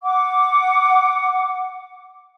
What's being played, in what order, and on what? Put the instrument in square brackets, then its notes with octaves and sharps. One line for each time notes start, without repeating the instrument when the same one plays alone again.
[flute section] F#5 D6